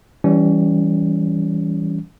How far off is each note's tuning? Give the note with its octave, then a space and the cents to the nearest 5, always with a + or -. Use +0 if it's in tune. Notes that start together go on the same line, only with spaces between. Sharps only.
E3 +0 G3 +0 C#4 +25